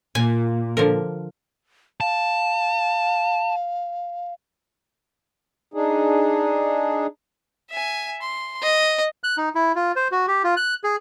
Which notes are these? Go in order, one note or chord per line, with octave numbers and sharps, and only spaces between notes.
A#2 G#5
D3 F3 A#4
F5 A5
D4 D#4 G#4
E5 G#5
C6
D#5
F#6
D#4
E4
F4
C5
F#4
G4
F4
F#6
G#4